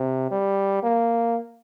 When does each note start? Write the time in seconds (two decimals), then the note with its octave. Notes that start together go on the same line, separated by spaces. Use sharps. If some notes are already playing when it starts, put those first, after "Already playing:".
Already playing: C3
0.31 G3
0.83 A#3